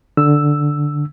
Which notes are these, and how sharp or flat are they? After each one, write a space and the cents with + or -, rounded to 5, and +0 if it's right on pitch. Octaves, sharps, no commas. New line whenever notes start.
D3 +0 E6 +0